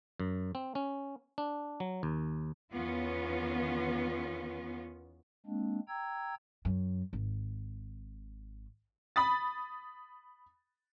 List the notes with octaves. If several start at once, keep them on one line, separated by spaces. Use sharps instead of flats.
F#2
C4
C#4
D4
F#3
D#2
E2 D#3 B3 C#4 F4
G#3 A#3 C4 D4
G5 A#5 E6 G#6
F#2
G#1
B5 D#6 A6